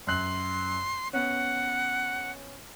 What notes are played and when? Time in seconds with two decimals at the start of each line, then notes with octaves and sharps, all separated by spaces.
0.07 F#2 C6 F#6 F#7
1.13 B3 C#4 F#5